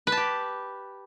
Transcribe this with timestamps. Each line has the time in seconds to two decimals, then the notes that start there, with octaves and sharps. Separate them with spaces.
0.07 B4
0.12 A5
0.17 G4